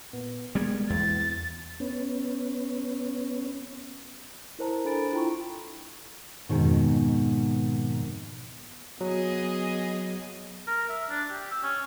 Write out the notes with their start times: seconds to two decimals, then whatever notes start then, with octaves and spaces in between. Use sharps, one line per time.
0.13 A#2 B3
0.55 G3 G#3 A#3 B3 G#6
0.90 E2 A6
1.80 B3 C#4
4.59 E4 A#4 C5 A5 A#5
4.85 D4 A4 G#5 B5 A6 D7
5.13 E4 F4 G5 A#5 C6 C#6
6.49 F2 G#2 B2 D#3
9.01 F#3 B3 G#4 D#5
10.67 A#4
10.89 E5
11.10 D4
11.30 G4
11.51 E6
11.63 C#4